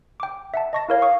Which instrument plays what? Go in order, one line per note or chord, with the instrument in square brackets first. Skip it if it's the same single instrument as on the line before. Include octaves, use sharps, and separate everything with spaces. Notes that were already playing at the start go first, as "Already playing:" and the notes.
[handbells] G5 D6
E5 F#5 A5
[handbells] D#5 C#6 A#6 [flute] A5
[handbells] E4 A#4 C#5 [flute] F5
[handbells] C#6 D#6